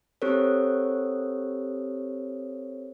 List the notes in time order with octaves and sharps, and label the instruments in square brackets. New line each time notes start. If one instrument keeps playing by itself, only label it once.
[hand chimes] C4 G4 A4 A#4 C5 C#5